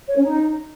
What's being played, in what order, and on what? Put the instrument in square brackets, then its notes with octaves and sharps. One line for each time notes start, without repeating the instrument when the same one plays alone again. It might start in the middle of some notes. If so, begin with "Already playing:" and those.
[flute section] C#5
C#4
D#4